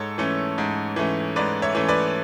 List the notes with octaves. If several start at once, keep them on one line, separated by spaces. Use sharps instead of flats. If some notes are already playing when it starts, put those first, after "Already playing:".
Already playing: G#2 A4 C#5
E3 A3 C#4
G#2
E3 A3 C#4
G#2 B4 D5
C#5 E5
E3 A3 C#4
B4 D5